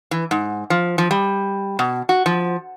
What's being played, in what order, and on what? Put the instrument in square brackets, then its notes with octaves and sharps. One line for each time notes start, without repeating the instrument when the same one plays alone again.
[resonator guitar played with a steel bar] E3
G#2
F3
F3
G3
B2
F#4
F3